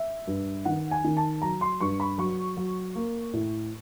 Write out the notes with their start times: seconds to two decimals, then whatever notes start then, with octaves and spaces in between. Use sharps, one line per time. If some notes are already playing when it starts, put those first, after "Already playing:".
Already playing: E5
0.27 G2
0.65 D#3 F#5
0.91 G#5
1.04 D#3
1.17 A5
1.42 F#3 A#5
1.61 C6
1.80 G2 C#6
2.00 B5
2.18 F#3 C#6
2.57 F#3
2.95 A#3
3.33 A2